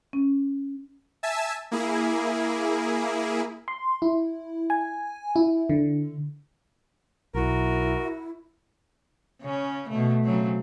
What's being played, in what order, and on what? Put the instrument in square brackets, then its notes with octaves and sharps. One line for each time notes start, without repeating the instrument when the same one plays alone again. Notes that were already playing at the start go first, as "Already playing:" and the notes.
[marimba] C#4
[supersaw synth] E5 G#5 A5 E6
A#3 E4 G#4
[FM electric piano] C6
E4
G#5
E4
D3
[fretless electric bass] B1 [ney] E4 [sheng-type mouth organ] F#4 [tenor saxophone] A#4
[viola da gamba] C#3 C#4
B2 A3
C#3 F#3 C4